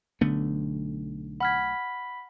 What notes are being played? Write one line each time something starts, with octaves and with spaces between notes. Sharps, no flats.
B1 D3 A3 B3
F#5 B5 F6 G#6 B6